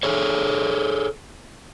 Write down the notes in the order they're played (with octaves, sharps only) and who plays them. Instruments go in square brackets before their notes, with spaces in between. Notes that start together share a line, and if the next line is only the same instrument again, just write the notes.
[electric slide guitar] G#4 A4 C#5